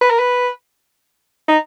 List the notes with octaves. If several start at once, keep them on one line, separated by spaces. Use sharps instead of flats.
B4
A#4
B4
D#4